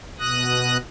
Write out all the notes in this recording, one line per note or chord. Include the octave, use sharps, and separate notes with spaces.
B2 D#6 F#6 A#6